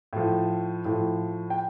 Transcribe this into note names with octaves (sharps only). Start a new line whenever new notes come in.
A2 F3
A2 F3
G5